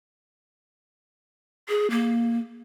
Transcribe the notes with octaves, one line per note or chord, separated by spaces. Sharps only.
G#4
A#3